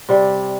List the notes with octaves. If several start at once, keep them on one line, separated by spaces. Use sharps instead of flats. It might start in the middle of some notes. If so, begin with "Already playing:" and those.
C3 G3